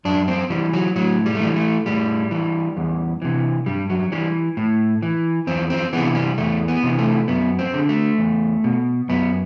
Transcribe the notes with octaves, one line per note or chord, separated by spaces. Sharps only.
F#2 D4
C4
E3 G3
F#3
A2 F#3
G3
A3
E3 G3
A3
A2 G3
E3
E2
C3 E3
G2 G3
F#3
E3 G3
A2
E3
E2 C4
C4
C3 E3 B3
G3
E2 A3
B3
C3 E3
A3
F#2 B3
C4
D3
A3
E2
B2
F#2 B3